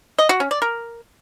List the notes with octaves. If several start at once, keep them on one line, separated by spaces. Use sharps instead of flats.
D#5
F#4
C#4
D5
A#4